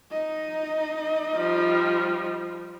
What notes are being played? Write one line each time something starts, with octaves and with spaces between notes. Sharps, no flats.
D#4 D#5
F3 G3